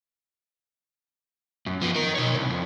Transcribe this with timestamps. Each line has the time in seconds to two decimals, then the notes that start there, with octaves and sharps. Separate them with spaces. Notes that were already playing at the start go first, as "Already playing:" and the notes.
1.66 F#2
1.81 F3 B3
1.95 D#4 A#4
2.15 B2 C#5
2.36 C2
2.50 F2